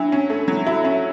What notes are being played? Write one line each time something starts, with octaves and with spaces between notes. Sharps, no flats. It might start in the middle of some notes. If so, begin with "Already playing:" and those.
Already playing: F#3 D4 E4
C#4
A3
F#3 E4
E4 F#4
C#4 E5